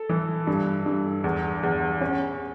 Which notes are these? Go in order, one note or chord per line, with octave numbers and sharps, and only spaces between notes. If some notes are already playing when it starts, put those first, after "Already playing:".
Already playing: A4
E3
G2
G2
E2
E2
C#4